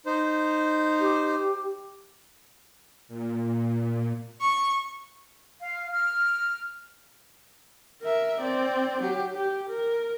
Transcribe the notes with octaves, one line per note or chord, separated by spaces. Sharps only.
D#4 C5
G4
A#2
C#6
F5
F6
A#4 E5
C4 D5
F#3 G4
G4
A#4